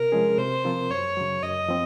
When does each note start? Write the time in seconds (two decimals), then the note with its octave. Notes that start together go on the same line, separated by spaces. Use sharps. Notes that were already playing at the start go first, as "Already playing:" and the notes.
Already playing: C3 A#4
0.12 F3 G#3 C#4 G#4
0.38 C3 C5
0.64 F3 C4 F4 A#4
0.90 F#2 C#5
1.17 C#3 F#3
1.43 F#2 D#5
1.69 F3 C4